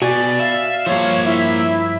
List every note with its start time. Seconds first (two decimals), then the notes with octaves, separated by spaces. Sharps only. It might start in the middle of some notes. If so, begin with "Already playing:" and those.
0.02 B2 B3 F#4 G4 D5 G#5
0.40 E5 F5
0.86 G2 F3 A#3 C5 C#5
1.25 E4 E5